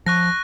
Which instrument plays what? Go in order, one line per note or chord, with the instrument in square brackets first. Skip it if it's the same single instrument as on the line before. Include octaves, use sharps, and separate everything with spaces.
[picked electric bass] F3 [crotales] C#6 F#6 A#6